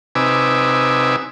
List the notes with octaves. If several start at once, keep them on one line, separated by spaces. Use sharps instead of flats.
C3 D#4 B4 G#5 D6 E6